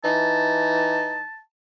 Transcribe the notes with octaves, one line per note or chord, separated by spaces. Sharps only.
E3 D#4 A5